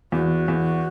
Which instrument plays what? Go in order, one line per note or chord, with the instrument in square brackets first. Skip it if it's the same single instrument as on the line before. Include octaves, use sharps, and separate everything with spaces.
[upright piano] E2 [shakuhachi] F#4
[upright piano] E2